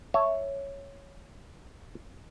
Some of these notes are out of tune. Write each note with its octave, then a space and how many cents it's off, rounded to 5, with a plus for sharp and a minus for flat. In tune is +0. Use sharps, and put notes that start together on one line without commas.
C#5 +0 E5 +0 A5 +15